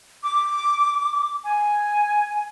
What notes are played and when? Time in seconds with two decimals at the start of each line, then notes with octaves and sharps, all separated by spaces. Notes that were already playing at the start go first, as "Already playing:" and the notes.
0.23 D6
1.44 G#5